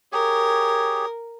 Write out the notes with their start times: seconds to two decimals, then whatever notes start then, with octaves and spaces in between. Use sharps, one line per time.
0.12 G4 G#4 A#4 C#5